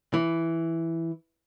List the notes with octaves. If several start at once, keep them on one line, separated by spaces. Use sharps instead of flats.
E3